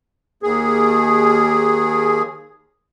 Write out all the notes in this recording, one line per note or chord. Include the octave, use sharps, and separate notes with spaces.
D#2 G#4